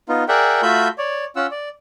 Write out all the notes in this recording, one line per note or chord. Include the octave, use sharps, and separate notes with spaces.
B3 D#4 F4
G#4 A#4 D5 E5 F#5 G5
A3 F4 F#4 E5 B5 G6
C#5 D5
C#4 F4 F#5 E6
D5